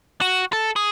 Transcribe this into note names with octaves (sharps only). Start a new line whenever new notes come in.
F#4
A4
G#4